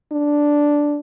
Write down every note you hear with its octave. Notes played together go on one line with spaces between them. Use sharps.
D4